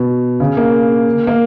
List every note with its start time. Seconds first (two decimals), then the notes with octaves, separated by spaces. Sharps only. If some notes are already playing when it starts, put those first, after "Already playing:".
Already playing: B2
0.40 C#3
0.57 A#3
1.27 A#3